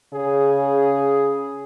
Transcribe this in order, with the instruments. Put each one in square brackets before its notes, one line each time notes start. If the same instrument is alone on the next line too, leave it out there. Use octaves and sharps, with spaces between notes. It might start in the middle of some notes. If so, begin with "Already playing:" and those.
[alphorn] C#3 [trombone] G#4